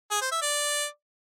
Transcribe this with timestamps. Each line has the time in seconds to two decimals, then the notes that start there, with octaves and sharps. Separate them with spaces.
0.11 G#4
0.21 C5
0.32 E5
0.42 D5